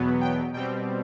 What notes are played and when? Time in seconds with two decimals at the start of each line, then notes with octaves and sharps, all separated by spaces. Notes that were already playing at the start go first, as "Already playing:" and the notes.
Already playing: E2 B2 F#3 B3
0.21 G5
0.53 B2 G3 C4 G5